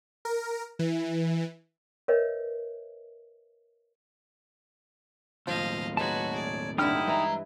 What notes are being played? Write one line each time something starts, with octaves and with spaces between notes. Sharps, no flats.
A#4
E3
A#4 B4 C#5 D#5 E5
D#2 A2 F3 D#5 F5
G#3 D#4 F#4 B4 C#5 A5
G#4 D5
G2 D3 D#4 E4 G5 F6
E3 G#3 D#5 A#5